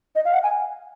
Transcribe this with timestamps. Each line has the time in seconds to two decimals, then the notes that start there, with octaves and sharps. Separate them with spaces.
0.15 D#5
0.25 F5
0.33 F#5
0.43 G#5